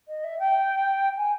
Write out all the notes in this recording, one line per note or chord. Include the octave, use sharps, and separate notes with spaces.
D#5
E5
G5
G#5